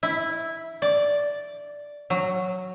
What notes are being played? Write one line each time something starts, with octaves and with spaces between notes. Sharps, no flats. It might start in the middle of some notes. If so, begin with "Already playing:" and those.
E4
D5
F#3